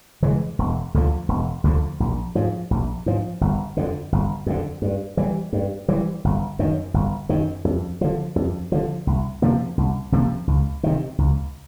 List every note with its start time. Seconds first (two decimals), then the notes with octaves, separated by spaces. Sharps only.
0.22 C#3 E3 G#3
0.59 E1
0.94 D2 D3 F3
1.28 E1
1.64 D2 D3 F3
2.00 A#1
2.35 G#2 F3
2.71 A#1
3.06 G#2 F3
3.41 G1
3.77 F2 D3
4.12 G1
4.46 F2 D3
4.82 G2
5.17 E3 G3
5.53 G2
5.88 E3 G3
6.24 G1
6.59 F#2 D#3
6.94 G1
7.29 F#2 D#3
7.65 F2
8.01 D3 F3
8.36 F2
8.72 D3 F3
9.07 C2
9.42 C3 F3 A#3
9.77 C2
10.12 C3 F3 A#3
10.47 C#2
10.83 C3 D#3
11.18 C#2